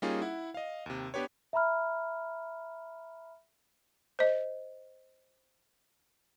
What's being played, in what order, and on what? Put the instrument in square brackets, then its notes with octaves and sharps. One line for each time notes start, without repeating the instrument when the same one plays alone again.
[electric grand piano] G3 A#3 C#4 D#4 F4 G#4
E4 F#5
D#5 F5
D#2 C3
B3 D4 G4 B4 C#5
[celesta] E5 A#5 B5 F6
[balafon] C5 D#5